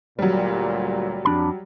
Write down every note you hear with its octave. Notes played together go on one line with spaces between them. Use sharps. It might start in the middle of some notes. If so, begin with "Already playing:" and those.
D2 A#2 F#3 G3
F2 D4 B5